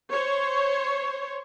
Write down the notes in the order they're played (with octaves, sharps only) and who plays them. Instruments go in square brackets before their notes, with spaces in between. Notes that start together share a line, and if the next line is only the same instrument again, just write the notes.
[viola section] C5 C#5